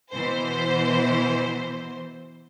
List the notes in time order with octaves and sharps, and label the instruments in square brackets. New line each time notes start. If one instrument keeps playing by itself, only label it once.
[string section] B2 E3 C5